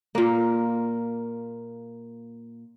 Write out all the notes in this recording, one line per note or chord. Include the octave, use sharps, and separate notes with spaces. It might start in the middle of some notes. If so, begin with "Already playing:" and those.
A#2 A#3